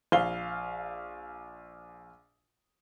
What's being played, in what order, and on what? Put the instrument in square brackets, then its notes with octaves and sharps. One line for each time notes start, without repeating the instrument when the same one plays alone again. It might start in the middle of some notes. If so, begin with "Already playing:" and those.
[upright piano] A#1 F5 G7